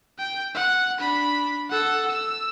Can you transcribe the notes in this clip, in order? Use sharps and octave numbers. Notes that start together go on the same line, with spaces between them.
G5
F#5
D4 B5
A4 F#5
E6